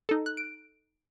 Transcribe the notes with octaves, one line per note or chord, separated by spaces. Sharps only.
D#4 A4
F#6
D7